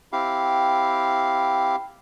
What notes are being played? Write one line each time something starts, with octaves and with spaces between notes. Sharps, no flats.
C4 E4 G4 F5